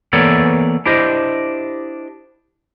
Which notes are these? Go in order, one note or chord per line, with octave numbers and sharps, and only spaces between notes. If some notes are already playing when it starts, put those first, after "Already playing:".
E3 A#3 B3 A4 C#5 D5
D4 E4 G4 C5 D#5